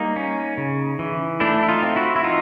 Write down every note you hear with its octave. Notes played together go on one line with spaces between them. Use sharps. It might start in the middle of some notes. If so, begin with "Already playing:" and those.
Already playing: G3 A#3 D#4
C#4
C#3
E3
A3 D4 E4
E4
D#4 F4
C4
E4 F#4
E4
E3 D#4 F4